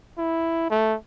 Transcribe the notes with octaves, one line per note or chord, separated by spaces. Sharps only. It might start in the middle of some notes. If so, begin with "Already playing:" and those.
E4
A3